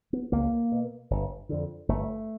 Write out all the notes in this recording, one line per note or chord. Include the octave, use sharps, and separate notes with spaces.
B3
C#2 A#3
B2
G1
F2 D3
G1 A3